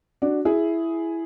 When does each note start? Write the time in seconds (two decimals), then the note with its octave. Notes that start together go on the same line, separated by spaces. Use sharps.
0.22 D4 F#4
0.45 E4 G#4